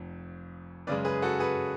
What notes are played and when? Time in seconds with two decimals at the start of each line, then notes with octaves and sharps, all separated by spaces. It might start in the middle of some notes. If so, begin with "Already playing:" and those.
Already playing: F1 F2 F3
0.87 F#2 C#3 G#3 B4 D5
1.05 G#4 B4
1.22 F#4 A4
1.39 G#4 B4